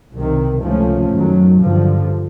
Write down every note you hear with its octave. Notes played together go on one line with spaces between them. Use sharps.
C2 C3 D#3
C#2 C3 F3 A3 C#4
F#2 D#3 F#3
G2 D3 F3